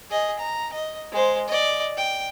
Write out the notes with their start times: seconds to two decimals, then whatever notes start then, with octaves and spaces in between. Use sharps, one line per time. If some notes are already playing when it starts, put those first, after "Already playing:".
0.10 G#4 D#5
0.39 A#5
0.73 D#5
1.12 G#3 C5
1.48 D5 D#5
1.97 G5